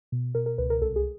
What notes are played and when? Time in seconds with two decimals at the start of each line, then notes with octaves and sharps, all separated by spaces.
0.12 B2
0.35 B2 A#4
0.46 A#4
0.58 C#2 B4
0.70 A#4
0.81 C2 A4
0.96 G#4